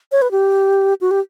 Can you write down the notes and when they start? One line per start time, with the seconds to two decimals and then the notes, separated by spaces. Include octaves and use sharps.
0.12 C#5
0.22 B4
0.31 G4
1.01 F#4
1.11 G4